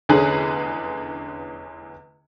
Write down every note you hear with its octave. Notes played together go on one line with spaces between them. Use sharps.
F1 E2 D3 C#4 G#4 B4